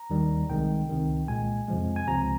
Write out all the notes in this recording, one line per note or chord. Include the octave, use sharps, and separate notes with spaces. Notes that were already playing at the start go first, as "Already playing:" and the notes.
Already playing: A#5
D#2 D#3 G3
C2 C3 D#3 G#3 G5
C#2 C3 D#3
C2 A#2 G#3 G#5
F2 C3 F3 G#3
G#5
C#2 C3 F3 A#5